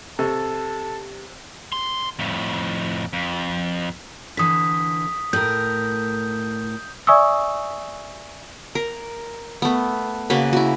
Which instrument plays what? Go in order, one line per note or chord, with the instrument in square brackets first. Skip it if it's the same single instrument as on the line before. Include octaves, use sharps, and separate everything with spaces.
[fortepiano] C3 [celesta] G4 [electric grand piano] A4 [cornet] A5
[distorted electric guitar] C6
F2 A2
F2
[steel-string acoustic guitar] D3 E3 [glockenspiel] D#6 B6
[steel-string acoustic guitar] A2 A#4 [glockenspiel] G6
[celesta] D5 E5 G#5 C#6 D#6 E6
[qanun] A#4
A3 B3
C#3 A#3 F#4 B4
E4 F#4